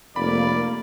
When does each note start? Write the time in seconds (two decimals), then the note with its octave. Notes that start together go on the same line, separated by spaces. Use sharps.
0.16 F1 A#3 D5 B5